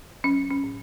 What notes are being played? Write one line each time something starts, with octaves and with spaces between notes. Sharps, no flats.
F#3 C#4
C#4
A2